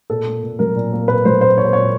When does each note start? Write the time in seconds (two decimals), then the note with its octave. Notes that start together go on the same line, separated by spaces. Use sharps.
0.10 A#2 A4
0.27 A#3
0.43 A#2
0.59 F#3 A#4
0.75 A#2
0.93 A#3
1.08 A#2 B4
1.25 F#3 C5
1.41 A#2 C5
1.57 A#3 C#5
1.65 C5
1.73 A#2 C#5